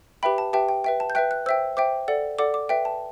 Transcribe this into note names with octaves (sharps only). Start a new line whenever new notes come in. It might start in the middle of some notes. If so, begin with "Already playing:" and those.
G4 B4 E5 G5 B5
A5
G4 B4 E5 G5 A5
G5
B4 E5 G5
A5
G6
B4 E5 G5 F#6
F#6
C5 E5 G5 E6
C5 E5 G5 D6
A4 D5 F#5
A4 D5 F#5 D6
D6
B4 E5 G5
A5